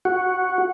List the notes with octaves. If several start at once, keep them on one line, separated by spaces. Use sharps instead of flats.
F#4